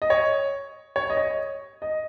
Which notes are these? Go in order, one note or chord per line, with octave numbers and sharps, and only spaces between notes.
D#5
C#5
C#5
D#5
C#5
D#5